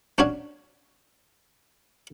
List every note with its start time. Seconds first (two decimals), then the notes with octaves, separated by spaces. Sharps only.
0.18 C#4 D4 F#4 C#5 F5